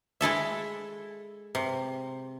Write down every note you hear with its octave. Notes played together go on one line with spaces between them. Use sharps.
G#3 E4 A4 E5
C3